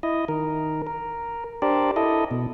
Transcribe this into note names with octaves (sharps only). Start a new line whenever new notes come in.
E4 D#5
D#3 A#4
A#4
D4 G4 A#4 C5 D5
E4 A4 D#5
B2